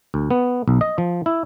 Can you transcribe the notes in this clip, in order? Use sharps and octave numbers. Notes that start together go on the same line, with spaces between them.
D2
B3
B1
D#5
F3
E4